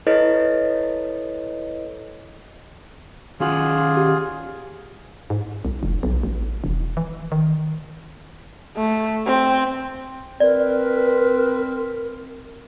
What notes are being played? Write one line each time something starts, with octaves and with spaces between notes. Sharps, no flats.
E4 A4 B4 C#5 D#5 A6
D#3 C#4 F4 F#4 G#4 F#5
G4
G#2
C2
F1
B1
A1
E1
E3
D#3
A3
C4
C4 A#4 B4 D5